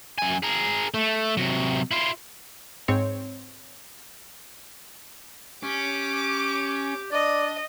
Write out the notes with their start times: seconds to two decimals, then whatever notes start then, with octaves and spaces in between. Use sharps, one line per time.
0.19 F#2 G#5
0.43 G#4 A#4
0.94 A3
1.37 C3 F#3
1.91 E4 F4
2.88 G#2 C4 C#5
5.63 C#4 G4 D6
7.12 D4 D5 D#5